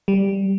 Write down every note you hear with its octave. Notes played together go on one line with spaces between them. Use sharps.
G3